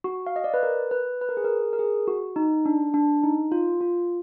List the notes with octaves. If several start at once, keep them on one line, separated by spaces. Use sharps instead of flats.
F#4
F5
D#5
D5
B4
A#4
B4
B4
A#4
G#4
A#4
A#4
G#4
F#4
D#4
D4
D4
D#4
F4
F4